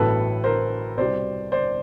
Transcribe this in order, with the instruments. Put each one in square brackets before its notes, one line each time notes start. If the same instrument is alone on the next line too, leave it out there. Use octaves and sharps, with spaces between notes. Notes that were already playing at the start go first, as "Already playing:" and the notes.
Already playing: [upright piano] A1 A2 F#3 B3 A4 B4
A#4 C5
C2 B2 G3 C5 D5
C5 D5